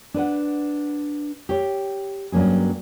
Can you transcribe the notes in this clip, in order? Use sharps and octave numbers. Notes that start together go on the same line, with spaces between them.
D4 B4 F#5
G4 C#5
G2 F#3 A#3 C#4 G#4